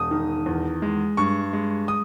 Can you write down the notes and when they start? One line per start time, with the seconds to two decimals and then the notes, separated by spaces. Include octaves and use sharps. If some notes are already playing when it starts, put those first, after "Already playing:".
Already playing: E1 D#6
0.11 D#3
0.46 E2
0.82 G#3
1.17 G2 C#6
1.53 G#3
1.88 D#6